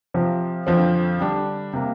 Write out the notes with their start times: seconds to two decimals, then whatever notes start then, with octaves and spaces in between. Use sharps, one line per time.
0.14 C3 F3 C4
0.67 F2 D3 F3 C4
1.18 D3 G3 D4
1.73 C3 A#3